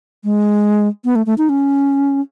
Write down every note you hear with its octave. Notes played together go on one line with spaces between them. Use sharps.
G#3
B3
A3
A3
D#4
C#4